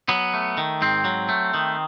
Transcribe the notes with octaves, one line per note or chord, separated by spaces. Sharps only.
F#3 B3
A3
D#3
G#2 C4
F#3
A3
D#3